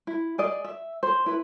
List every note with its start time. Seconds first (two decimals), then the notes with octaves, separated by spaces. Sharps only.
0.07 E4
0.38 G#4 D5 D#5
0.64 E5
1.03 C5
1.26 E4 B4